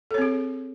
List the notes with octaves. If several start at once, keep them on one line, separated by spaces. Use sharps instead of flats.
C4 G#4 A4 C#5